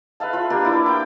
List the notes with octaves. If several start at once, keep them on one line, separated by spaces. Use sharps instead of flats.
B4 E5 F5 A5
F4 B5
A#3 D4 G4
E4 D6
G5 D6